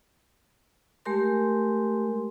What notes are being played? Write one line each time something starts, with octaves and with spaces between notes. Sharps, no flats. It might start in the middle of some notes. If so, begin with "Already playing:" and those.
G#3 A3 G4 A#4 C6